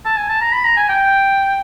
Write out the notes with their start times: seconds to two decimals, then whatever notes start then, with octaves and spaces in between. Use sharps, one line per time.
0.05 A5
0.17 G#5
0.29 A5
0.41 A#5
0.52 B5
0.64 A#5
0.77 G#5
0.89 G5